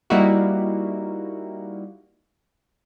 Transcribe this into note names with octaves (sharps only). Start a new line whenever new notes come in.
G3 A#3 D#4 E4 F#4